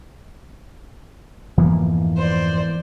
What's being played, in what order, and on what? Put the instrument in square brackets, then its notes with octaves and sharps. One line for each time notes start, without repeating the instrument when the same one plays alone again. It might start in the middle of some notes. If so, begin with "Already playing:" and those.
[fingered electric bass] F2 G#2 F3 [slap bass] E3 A#3 B3
[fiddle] C5 D5